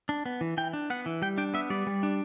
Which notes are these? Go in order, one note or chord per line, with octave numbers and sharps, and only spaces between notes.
D4
B3
E3
E3 G5
D4
B3 F#5
E3
G3 G5
D4 G5
B3 E5
G3 D5
G3
D4